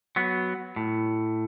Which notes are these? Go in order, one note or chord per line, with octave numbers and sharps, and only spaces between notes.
F#3 B3
A2